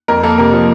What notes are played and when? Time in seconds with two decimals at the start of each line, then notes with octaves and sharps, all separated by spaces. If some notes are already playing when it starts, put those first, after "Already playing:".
0.08 F2 A#4
0.23 A#3 A4
0.38 C3 A#4
0.53 F3